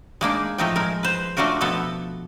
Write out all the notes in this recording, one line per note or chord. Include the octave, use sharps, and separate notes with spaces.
G#3 A#3 D4 D#4
A2 F3 A3 D#4 F4 G5
G#3 A#4
B4 C5
A3 D4 F4 F#4 A#4
B2 F3 B3 A4